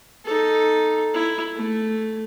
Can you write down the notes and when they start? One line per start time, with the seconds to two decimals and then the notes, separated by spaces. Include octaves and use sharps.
0.25 D#4 A4
1.14 E4
1.55 A3